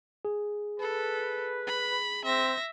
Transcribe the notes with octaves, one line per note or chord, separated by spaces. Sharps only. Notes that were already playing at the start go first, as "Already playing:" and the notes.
G#4
A4 B4
B5
C4 E5 A#6